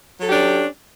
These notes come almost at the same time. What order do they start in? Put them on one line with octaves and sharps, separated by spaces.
F#3 A4 G4 D4 C#4